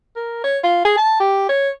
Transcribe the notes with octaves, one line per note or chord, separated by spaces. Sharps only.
A#4
C#5
F4
G#4
A5
G4
C#5